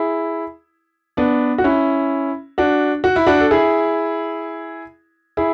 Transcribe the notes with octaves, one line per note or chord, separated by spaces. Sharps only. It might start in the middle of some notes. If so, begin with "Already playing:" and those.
Already playing: E4 G#4
B3 D4
F#4
C#4 E4
D4 F#4
F#4
E4
D4 F#4
A4
E4 G#4
E4 G#4